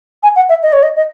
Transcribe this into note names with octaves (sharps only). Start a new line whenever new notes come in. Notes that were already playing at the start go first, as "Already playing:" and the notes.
G#5
F#5
E5
D#5
C#5
D#5
D#5